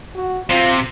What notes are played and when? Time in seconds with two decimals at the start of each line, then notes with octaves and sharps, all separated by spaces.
0.15 F#4
0.49 C3 F4